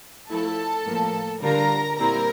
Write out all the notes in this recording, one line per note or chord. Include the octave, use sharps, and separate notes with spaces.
F3 A3 E4 A4 A5
A2 F3 A#3
D3 G3 D4 F4 A#4 A#5
A#2 G3 C4 E4 A#4 A#5